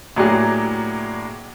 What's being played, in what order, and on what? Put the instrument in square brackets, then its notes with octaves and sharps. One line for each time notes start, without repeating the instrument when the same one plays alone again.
[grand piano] A2 F#3 A#3 D4 G4 G#4